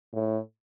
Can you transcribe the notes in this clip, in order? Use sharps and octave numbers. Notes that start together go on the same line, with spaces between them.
A2